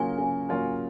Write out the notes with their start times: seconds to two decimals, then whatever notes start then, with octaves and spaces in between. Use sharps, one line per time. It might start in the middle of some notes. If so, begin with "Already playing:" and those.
Already playing: C#3 F#3 A#3 F4 A#4 G#5
0.18 C#3
0.49 F#3 A#3 F4 A#4